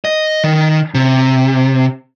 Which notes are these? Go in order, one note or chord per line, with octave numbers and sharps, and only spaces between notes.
D#5
D#3
C3